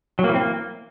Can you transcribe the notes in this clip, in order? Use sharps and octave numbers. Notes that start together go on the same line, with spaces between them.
F#3
A#3
E3
C4
A#3